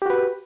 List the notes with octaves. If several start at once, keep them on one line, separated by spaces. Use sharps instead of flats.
F#4 G4 B4